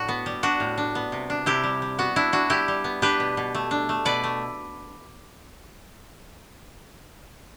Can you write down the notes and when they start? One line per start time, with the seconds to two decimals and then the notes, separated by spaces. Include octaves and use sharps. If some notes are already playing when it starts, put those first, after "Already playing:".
Already playing: A2 D4 F#4
0.09 B3
0.26 G3
0.43 D4 F#4
0.60 A2
0.78 D4
0.95 B3
1.12 C3
1.30 D4
1.46 C3 E4 G4
1.64 G3
1.82 G3
1.98 B3 F#4
2.16 D4 E4
2.32 D4 F#4
2.50 G3 E4 G4
2.68 G3
2.84 B3
3.02 D4 G4 B4
3.20 B2
3.37 B2
3.55 A3
3.71 D4
3.89 A3
4.05 B2 B4 D5
4.24 A3